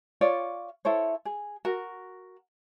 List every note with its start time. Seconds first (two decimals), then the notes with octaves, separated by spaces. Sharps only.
0.21 F4 C#5 D5
0.85 E4 A4 C5 C#5
1.25 G#4
1.65 F#4 A#4